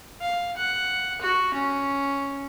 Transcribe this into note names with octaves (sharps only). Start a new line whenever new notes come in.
F5
F#5
F#4
C#4